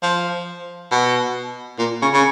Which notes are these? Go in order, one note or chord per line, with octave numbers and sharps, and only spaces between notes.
F3
B2
A#2
C#3
C#3